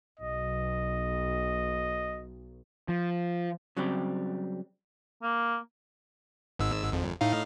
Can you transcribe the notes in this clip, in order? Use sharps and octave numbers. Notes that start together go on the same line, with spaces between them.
B1 D#5
F3
C#3 F#3 G3 C4 G4
A#3
G#1 G#2 E6
G#1 F2
A2 D#4 F5